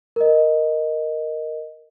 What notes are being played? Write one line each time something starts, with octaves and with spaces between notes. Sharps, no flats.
A#4 D#5